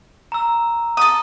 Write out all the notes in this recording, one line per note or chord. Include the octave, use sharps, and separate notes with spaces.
A#5 E6
A4 D#6